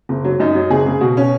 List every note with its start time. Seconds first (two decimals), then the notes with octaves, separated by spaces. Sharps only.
0.09 F#1
0.24 F#3
0.40 F#2 D#4
0.55 F#3
0.70 F#1 G#4
0.86 C#3
1.01 B2 F#4
1.17 C#4